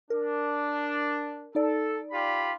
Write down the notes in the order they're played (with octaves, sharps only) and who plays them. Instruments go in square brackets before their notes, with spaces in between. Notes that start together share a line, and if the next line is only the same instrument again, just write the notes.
[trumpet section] D4 [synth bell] A#4
[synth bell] D#4 D5 [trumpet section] A4
[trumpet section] F4 G4 B5